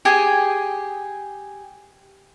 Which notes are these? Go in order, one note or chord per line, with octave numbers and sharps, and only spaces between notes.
G4 G#4 G#5